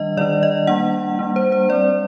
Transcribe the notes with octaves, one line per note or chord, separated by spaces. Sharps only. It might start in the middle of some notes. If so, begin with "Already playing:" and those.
Already playing: D#3 G3 D4 D#5
D#3 G3 D4 D5
D#5
G3 A#3 D4 F#5
G3 A#3 D4
C5
C5
G3 C4 D5